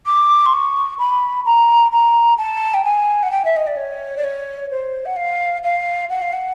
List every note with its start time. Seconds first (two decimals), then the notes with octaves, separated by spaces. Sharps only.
0.06 D6
0.45 C6
0.52 C#6
0.98 B5
1.45 A#5
1.91 A#5
2.37 A5
2.73 G5
2.84 G#5
3.22 F#5
3.31 G5
3.44 E5
3.56 D#5
3.67 D5
3.76 C#5
4.16 D5
4.24 C#5
4.70 C5
5.05 F#5
5.16 F5
5.63 F5
6.09 F#5
6.21 F5
6.32 F#5